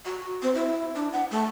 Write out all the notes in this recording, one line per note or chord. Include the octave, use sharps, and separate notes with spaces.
F#4
C4
E4
D4
F#5
A3